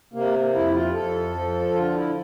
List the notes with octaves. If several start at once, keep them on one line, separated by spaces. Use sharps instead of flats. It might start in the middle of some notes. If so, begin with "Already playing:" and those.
C3 A#3
F2 E4
F4
F2 A4
F3
D3 F4
E4